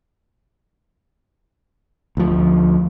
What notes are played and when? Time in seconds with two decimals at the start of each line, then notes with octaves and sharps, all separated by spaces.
2.17 D2 F3